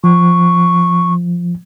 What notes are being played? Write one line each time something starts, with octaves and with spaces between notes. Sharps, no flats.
F3 C#6